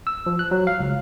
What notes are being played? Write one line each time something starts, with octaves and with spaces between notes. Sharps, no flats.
E6
F3
F#6
F#3
F5
C#2